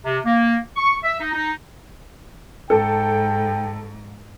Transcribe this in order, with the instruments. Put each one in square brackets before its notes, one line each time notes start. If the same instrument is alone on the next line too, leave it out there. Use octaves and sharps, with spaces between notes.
[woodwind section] C3
A#3
C#6
E5
D#4
D#4
[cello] G#2 [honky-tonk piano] A4 [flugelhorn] G5